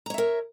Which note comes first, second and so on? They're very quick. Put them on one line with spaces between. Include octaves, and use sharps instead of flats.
A#5 C#5 E5 A#4